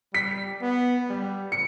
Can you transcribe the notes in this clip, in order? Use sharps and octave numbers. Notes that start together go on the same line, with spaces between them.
G3 B6
B3
G3
C#7